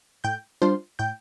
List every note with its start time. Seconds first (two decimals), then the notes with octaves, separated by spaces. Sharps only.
0.24 A2 G5 G6
0.62 G3 D4 F4 C5 C6
0.99 A2 G5 G6